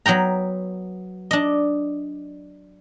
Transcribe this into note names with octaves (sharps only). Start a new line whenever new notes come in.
F#3 B3 G5 A#5
D4 D#5